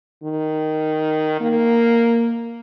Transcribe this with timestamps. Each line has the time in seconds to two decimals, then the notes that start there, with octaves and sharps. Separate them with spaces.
0.24 D#3
1.41 A#3